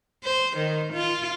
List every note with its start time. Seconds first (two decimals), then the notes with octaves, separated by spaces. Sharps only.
0.24 C5
0.57 D#3
0.93 F4